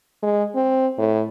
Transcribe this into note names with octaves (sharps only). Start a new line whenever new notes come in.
G#3
C4
A2